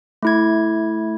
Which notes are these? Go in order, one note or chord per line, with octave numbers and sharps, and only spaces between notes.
A3 E4 G#6